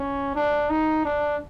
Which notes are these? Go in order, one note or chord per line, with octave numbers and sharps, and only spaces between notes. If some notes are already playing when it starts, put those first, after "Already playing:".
Already playing: C#4
D4
D#4
D4